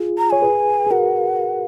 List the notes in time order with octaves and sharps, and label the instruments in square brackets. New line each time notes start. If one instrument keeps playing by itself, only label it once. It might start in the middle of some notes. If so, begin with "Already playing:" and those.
Already playing: [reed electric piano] F4 G#4
[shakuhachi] A#5
[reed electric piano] C#5 [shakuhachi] G#5
[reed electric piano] G#4 B4
G#4
[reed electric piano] F#4 A#4 [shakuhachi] F#5